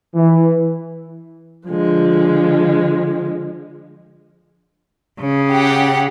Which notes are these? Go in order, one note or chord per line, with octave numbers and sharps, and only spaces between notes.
E3
D3 F3 G#3
C#3
G4 F#5